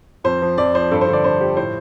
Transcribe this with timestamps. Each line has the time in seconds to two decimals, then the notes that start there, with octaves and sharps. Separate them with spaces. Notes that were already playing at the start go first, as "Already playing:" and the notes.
0.24 F2 C5
0.42 F3
0.58 F2 D5
0.74 F3 C5
0.91 G2 A4
1.01 C5
1.07 D3
1.13 D5
1.24 G2 C5
1.41 F3 G4
1.57 A2 C5